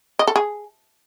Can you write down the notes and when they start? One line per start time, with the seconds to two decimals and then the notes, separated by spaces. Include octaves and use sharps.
0.19 D#5
0.27 A4
0.36 G#4